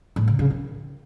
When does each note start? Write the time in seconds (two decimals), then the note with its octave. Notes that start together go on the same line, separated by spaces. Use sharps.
0.16 A2
0.28 C#3
0.39 C#3
0.50 D#3